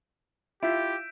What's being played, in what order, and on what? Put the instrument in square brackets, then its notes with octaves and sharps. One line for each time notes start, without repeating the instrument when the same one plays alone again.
[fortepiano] E4 F4 [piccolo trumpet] G4 [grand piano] E5 [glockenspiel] G6 D7